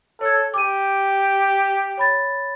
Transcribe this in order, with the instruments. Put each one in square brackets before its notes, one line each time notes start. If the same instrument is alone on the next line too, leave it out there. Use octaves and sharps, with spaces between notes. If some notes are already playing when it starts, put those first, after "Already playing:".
[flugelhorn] A4 [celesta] C#5 G#6
[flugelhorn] G4 [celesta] D6 D#7
[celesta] C#5 B5 A6